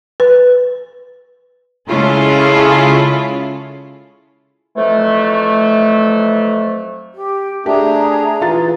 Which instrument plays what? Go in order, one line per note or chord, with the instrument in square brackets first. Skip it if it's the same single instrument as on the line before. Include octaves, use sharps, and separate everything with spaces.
[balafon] B4
[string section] C#3 G#3 C#4 E4 F4 A4
[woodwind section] F2 E3 F#3 A3
[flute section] G4
[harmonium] A3 D4 [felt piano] G4 [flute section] G#4 A#5
[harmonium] E3 [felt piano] F4 A6